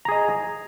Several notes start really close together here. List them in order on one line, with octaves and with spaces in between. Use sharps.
A#5 G#4 D#5